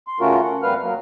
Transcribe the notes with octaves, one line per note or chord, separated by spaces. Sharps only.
C6
C#3 A3 C#4 F4 F#4 A#4
F#5
F2 G3 A#3 B4 F5 F6
F#3 A#3